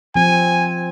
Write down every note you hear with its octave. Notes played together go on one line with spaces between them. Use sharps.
F3 C4 G#5